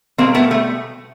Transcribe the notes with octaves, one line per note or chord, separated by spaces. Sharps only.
B2 G3 A#3 C4
A3 B3
A3